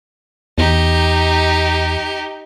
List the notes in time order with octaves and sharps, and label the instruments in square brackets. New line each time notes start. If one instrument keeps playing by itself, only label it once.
[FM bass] E2 [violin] D#4 G4